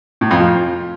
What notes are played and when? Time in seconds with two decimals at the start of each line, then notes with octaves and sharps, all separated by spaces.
0.21 A2
0.31 F2
0.40 F3